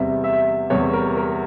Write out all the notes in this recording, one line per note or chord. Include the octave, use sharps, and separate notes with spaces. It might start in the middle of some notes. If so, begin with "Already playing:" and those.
Already playing: E2 C3 G3 E5
E5
E2 C3 G3 C#5
A#4
A#4